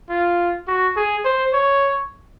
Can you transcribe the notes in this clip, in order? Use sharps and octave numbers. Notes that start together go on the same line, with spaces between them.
F4
F#4
G#4
C5
C#5